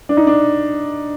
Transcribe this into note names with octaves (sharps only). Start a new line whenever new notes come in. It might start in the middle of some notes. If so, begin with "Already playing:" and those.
D4
D#4
D4